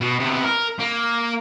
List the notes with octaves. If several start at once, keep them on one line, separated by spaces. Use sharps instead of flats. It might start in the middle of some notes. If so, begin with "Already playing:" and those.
B2
C3 B3
A#4
A#3